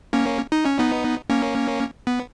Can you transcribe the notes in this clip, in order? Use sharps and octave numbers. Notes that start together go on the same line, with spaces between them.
A#3 C#4
D#4
C#4
B3 D#4
A#3 C#4
B3